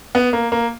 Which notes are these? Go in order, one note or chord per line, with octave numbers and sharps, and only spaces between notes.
B3
A#3
A#3